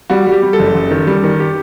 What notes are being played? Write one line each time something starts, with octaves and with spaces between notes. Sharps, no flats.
G3 F#4
G3 G4
G3
A4
F#1
F#1
D#3
G3
D#3
G4